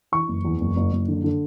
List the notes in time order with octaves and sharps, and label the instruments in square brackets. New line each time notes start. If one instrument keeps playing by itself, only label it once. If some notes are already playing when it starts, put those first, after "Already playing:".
[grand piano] E3 C#6
F#1
E2
F#1
F#1
F#1
D3
D3